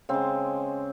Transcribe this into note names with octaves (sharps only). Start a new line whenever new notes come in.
C#3 G#3 C4